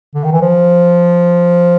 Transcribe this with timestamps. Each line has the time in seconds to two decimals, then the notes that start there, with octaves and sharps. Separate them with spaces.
0.14 D3
0.24 D#3
0.33 E3
0.42 F3